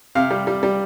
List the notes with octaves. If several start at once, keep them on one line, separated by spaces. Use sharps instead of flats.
C3 F5
G3
G3
G3